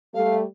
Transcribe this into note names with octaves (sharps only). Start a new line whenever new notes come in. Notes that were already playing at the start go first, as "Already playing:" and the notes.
G3 A3 F5